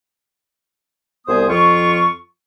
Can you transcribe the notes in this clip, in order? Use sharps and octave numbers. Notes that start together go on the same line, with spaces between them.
C2 B3 G#4 C5 D#6
F2 F3 F4 C#6